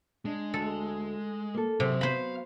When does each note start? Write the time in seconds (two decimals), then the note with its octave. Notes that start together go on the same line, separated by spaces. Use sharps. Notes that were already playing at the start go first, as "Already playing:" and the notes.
0.25 G#3 D4
0.54 D2 A4
1.54 A#3 A4
1.80 C3 F#3 G#4
2.01 F#3 B3 C5 F5 B5